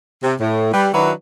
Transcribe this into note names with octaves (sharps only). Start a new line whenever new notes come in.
C3
A2
G3 B4
D#3 F#3 D4 E4 F#4 B4